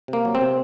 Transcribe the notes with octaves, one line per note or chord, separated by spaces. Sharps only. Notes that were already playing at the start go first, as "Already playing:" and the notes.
C3 A#3
F#3
C4
C3